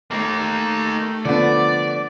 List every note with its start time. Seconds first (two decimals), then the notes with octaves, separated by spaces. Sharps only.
0.11 A3 A#3 D#4
1.25 D3 F3 B3 D5